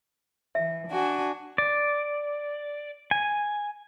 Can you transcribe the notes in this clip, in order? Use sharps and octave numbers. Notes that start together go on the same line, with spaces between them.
E3 E5
D4 F#4 G#5
D5
G#5